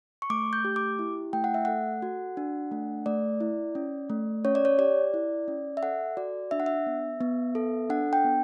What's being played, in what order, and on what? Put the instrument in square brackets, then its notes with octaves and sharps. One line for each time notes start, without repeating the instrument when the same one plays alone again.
[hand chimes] C#6
A3 D6
G6
G4
D6
E4
A3 G5
F#5
E5
A4 F#5
F#4
D4
A3
A3 D5
E4
C#4
A3
C#4 C#5
D5
C#5
G4 D5
E4
C#4
E5
A4 F#5
F#4 D5
D4 E5
F#5
E5
B3
B3
A4
D4 F#5
G5
B3